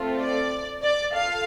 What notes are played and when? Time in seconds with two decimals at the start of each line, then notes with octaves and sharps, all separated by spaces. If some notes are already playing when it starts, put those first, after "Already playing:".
Already playing: A3 C4 F4 A4
0.21 D5
0.83 D5
1.13 F4 A4 F5